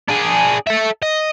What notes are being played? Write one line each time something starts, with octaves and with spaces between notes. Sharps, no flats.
D4 G#4
A4 E5
D#5